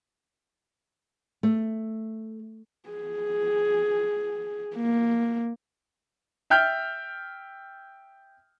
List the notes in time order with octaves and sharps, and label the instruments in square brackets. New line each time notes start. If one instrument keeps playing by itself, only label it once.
[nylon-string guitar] A3
[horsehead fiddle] G#4
A#3
[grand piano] E5 G5 F6 G6